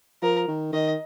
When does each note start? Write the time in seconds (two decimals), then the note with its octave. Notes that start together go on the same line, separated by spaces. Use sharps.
0.22 F3 A#4
0.48 D#3
0.72 D#3 D#5